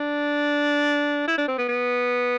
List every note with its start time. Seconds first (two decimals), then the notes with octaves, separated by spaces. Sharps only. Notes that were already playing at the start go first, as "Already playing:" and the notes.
Already playing: D4
1.27 E4
1.38 D4
1.48 C4
1.58 B3
1.68 B3